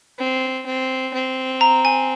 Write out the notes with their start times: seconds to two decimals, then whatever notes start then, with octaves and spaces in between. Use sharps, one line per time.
0.19 C4
0.66 C4
1.14 C4
1.61 A#5
1.85 G#5